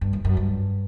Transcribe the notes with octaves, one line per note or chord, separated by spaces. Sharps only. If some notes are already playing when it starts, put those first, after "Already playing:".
G2
F#2
F#2
G2